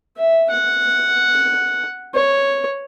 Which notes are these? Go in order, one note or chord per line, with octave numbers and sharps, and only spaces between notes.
E5
F#5
C#5